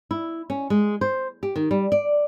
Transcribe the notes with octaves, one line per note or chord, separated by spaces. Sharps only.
E4
C#4
G#3
C5
G4
D#3
G3
D5